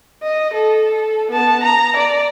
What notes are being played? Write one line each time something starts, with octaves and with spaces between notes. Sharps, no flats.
D#5
A4
B3 A5
A#5
D5